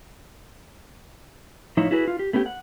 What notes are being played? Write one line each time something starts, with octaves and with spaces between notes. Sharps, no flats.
A2 F3 D#4 E4 C#5 E5
E4 F#4 G#4 B4
F4
G4
A3 B3 C#4 F#4 G4
F#5